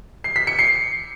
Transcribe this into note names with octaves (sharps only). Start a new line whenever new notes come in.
C7
B6
C#7
C7